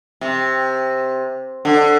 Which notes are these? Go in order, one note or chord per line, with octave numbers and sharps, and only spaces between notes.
C3
D3